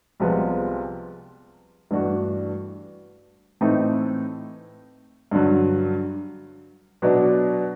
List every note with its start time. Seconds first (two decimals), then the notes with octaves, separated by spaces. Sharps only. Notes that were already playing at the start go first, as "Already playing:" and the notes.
0.20 C2 C3 F3 G#3 B3
1.91 G2 E3 A3 D4 F#4
3.61 A2 E3 A3 C4 D#4
5.31 G2 D3 F#3
7.02 B2 F#3 B3 D4